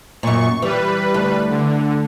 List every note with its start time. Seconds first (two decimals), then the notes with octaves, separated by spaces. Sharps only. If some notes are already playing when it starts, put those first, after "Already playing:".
0.23 F#2 A#2 C#6
0.62 E3 G3 B4
1.14 D2
1.50 D3